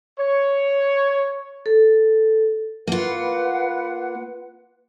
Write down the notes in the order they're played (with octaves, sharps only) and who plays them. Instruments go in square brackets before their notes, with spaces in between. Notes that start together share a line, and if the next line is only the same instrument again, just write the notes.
[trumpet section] C#5
[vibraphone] A4
[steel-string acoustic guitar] A#3 F4 [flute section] B4 F#5